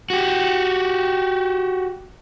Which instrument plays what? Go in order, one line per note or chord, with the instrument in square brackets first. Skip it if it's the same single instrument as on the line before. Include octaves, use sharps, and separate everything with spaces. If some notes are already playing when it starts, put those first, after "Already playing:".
[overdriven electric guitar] F#4 G4